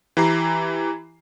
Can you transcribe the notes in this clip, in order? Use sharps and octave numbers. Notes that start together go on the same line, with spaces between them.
E3 E4 G4 A#5 C7